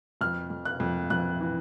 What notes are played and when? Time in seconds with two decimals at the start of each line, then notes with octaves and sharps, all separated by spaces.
0.21 F2 F6
0.50 F2
0.65 F#6
0.80 F2
1.10 F2 F#6
1.40 E3